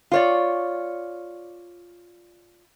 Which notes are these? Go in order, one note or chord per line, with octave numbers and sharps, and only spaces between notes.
F4 C#5 D5